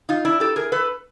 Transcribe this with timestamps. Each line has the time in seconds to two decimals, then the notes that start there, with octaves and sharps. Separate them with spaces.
0.09 D#4 F4
0.25 D4 E4
0.40 G4 A4
0.56 G#4 A#4
0.72 A4 B4